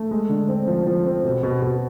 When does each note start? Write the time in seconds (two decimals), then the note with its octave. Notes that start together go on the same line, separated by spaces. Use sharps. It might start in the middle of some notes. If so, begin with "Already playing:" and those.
Already playing: A3
0.11 G#3
0.29 D3
0.49 C4
0.67 F3
0.87 F3
1.05 C4
1.24 B2
1.43 B2
1.62 B2